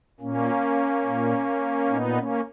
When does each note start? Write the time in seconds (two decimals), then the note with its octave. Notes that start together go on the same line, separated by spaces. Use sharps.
0.20 A#2 A#3 C#4
1.04 A#2
1.89 A#2 B3 D#4
2.17 A#3 C#4